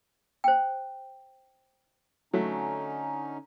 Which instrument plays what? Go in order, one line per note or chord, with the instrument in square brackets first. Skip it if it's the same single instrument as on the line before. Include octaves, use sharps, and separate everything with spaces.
[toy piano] C5 G5
[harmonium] D3 C#4 D#4 [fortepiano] F#3 A3